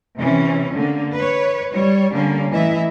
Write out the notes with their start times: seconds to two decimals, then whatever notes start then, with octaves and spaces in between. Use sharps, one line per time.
0.18 C3 E3 C#4
0.75 D3 A#3
1.15 B4 C#5
1.71 G3 C#5
2.11 D3 G3 A#3 C#4
2.50 A2 E3 E4 D#5 E5